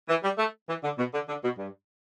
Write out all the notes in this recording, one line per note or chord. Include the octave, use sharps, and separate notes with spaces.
E3
G3
A3
E3
D3
B2
D3
D3
B2
G2